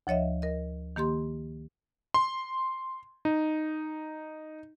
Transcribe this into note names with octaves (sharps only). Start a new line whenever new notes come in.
D2 F3 C#5 D#5 E5
A#4 D#5
D#3 A#3 G4 C6
C6
D#4